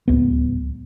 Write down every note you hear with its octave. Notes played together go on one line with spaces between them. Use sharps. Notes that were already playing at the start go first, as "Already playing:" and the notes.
D1 G#1 C#2 B3